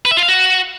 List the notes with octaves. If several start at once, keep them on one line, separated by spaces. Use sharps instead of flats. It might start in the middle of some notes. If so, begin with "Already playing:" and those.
B4
E5
F4
F5
F#4